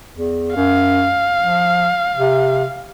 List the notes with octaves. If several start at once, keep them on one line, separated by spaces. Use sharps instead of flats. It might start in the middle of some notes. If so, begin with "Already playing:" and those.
E2
F#2 F5
F3
C3